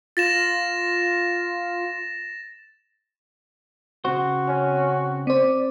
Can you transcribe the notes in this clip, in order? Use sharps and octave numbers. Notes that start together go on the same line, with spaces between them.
F4 A6 A#6 E7
C#3 C4 F#4 C5
C#4
C4 C5 D5